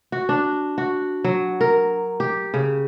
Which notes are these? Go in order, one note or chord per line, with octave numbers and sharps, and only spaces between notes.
F#4
D4
F#4
F#3
A#4
G4
C#3